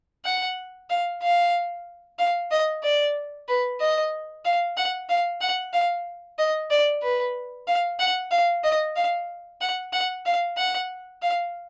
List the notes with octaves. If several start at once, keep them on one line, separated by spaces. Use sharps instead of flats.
F#5
F5
F5
F5
D#5
D5
B4
D#5
F5
F#5
F5
F#5
F5
D#5
D5
B4
F5
F#5
F5
D#5
F5
F#5
F#5
F5
F#5
F5